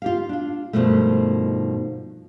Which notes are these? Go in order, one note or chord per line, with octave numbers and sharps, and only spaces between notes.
F4 G4 F5
D4 F4
G2 B2 D#3 F3 A3